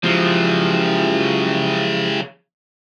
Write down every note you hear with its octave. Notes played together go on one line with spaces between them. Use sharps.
C#3 F3 F#3 G#3 E4 G4